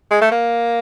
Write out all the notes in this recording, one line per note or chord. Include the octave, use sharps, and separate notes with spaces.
G#3
A3
A#3